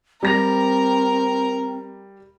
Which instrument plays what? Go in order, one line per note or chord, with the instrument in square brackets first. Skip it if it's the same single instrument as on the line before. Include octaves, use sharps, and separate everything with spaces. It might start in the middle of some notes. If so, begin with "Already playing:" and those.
[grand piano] G3 A#6 F7 [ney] C4 [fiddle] A#4